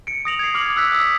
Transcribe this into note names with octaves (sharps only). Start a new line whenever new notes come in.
C#7 D7
D#6 A#6 F7 F#7
G#6 C7
D6 F6 F#7
E6 F#6 B6
D#6 E6